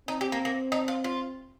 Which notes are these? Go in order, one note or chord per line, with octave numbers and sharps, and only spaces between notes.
C4 D#4
G4
A#3
A#3
D#4
F4
F4